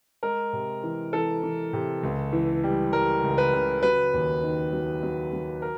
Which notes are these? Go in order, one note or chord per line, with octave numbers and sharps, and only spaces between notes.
G#3 A#4
C3
E3
E3 A4
E3
C3
C#2
E3
G3
G3 A#4
C#2
B4
C#3
F#3 B4
D#2
D#3
F#3
F#3
F#3
A#4